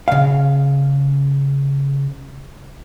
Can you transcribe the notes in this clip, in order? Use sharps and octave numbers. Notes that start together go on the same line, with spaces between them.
C#3 F5